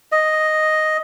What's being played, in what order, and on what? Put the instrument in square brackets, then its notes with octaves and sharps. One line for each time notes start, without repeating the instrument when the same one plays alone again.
[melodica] D#5